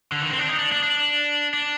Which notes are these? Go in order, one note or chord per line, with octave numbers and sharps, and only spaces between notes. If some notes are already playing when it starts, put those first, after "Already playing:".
D3
D#3
C4
D4
D#4
D4
D4
D4
D4